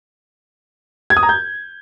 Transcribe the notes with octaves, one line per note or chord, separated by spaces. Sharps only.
G#6
D#6
A#5
G6